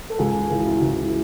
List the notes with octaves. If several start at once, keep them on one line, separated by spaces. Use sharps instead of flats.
A4
C#2 G#4
C#3 E3 G#4
F#4
E4
F#4
C#2 E4